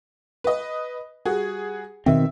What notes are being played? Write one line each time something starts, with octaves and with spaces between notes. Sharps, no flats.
B4 D#5
G3 F#4 G#4
B2 D#3 C4 E5